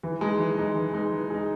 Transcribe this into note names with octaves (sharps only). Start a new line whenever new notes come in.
E3
G#3 D#4
E3
G#3 D#4
E3
G#3 D#4
E3
G#3 D#4